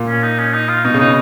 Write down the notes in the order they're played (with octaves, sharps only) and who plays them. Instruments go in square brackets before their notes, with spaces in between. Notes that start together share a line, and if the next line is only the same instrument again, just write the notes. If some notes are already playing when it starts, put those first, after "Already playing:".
Already playing: [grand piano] A#2
[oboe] C#4
D#4
C#4
D#4
F4
[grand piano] B2 [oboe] D#4
[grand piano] C#3
[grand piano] B2 [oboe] D#4